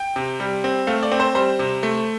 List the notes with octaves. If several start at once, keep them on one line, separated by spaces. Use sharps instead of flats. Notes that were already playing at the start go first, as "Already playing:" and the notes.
Already playing: G5
C3
G3
C4
A3 F5
D5
C4
C5
G3 C5
C3
A3